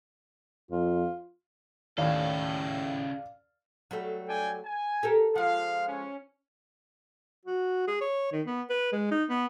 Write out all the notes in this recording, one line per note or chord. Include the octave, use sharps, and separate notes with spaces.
F2 F4
D#2 A2 C#3 A4 D5 F5
F#3 G3 A3
D4 G5 G#5
G#5
G4 A4 A#4
F3 G#3 F5
C#4
F#4
G#4
C#5
D#3
B3
B4
G#3
D#4
B3